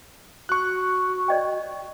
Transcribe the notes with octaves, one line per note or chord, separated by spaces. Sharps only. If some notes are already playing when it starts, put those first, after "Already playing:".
F#4 C#6 F#6
D5 D#5 G5